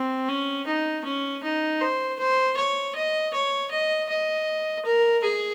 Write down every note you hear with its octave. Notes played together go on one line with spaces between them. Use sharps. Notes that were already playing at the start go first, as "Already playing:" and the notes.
Already playing: C4
C#4
D#4
C#4
D#4
C5
C5
C#5
D#5
C#5
D#5
D#5
A#4
G#4